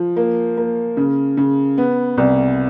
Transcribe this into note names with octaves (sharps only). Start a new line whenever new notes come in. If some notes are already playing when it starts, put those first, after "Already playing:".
Already playing: F3
A#3
A#3
C#3
C#3
B3
C2